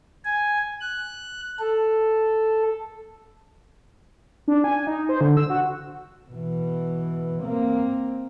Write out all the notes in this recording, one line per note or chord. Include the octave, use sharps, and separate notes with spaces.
G#5
F#6
A4
D4
G#5
D#4
C5
D3
E6
F#4
B2 E3
A#3 C4